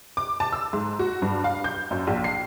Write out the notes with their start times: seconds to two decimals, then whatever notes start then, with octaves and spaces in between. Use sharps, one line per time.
0.17 D6
0.40 A5
0.52 E6
0.73 G#2
0.99 F#4
1.22 G2
1.44 F5
1.64 G6
1.91 F#2
2.07 A#1
2.24 C7